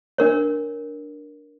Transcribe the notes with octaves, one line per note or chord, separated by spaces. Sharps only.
D4 A#4 C#5